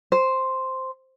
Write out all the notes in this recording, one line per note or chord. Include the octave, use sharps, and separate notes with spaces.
C5